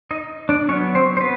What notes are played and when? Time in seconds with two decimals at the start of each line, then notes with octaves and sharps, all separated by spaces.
0.11 D#4 D#5
0.49 D4 D5
0.69 F#3 B3 C#4 C#5
0.95 C4 C5
1.17 C5
1.21 B3 B4